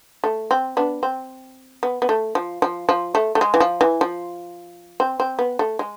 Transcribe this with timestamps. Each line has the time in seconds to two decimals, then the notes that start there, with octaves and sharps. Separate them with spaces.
0.24 A3
0.51 C4
0.77 B3 D4
1.03 C4
1.83 B3
2.02 B3
2.09 A3
2.35 F3
2.62 F3
2.89 F3
3.15 A3
3.35 A3
3.41 G#3
3.54 E3
3.60 F3
3.81 E3
4.01 F3
5.00 C4
5.20 C4
5.39 B3
5.59 A3
5.79 G#3